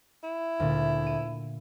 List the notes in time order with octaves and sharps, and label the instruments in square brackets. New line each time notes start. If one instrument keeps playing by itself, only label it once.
[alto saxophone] E4
[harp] D2 A#2
D#7